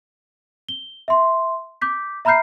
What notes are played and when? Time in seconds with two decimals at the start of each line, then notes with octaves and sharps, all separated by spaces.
0.69 G7
1.08 E5 C6
1.81 D6 G6 B6
2.25 E5 A#5 B5 F6 G6 C7